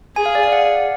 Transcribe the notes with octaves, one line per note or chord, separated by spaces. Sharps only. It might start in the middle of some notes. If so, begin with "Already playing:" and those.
G#4 G#5
F5
D5
F5
F#5